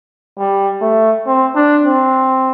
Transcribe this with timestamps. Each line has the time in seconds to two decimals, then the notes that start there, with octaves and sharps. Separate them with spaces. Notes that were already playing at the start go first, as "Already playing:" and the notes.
0.39 G3
0.82 A3
1.26 C4
1.56 D4
1.84 C4